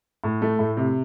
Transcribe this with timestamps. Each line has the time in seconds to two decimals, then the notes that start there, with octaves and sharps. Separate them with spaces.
0.24 A2
0.42 A3
0.59 A2
0.77 C3